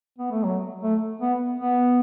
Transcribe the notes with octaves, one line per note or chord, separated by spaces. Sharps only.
B3
A3
F#3
A3
B3
B3